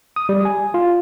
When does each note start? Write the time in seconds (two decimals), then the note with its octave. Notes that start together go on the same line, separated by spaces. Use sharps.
0.16 D#6
0.29 G3
0.45 G#5
0.74 F4